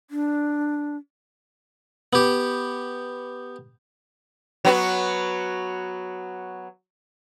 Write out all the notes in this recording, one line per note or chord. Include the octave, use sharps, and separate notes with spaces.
D4
B3 G4
F#3 B3 F#4